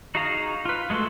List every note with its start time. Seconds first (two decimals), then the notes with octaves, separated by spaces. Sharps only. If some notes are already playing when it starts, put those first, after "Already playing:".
0.15 D#4 F#4 G#4 F5 A#5
0.65 F4 B4
0.90 G#3 A3 F#4 A4 C6